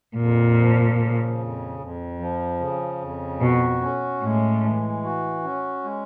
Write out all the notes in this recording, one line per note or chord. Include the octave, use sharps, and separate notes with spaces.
F2 A#2
F3
C#3
F2
F2
F3
C#3
F2
B2 F#4
C#4
A2 G#3
E3
F#4
C#4
G#3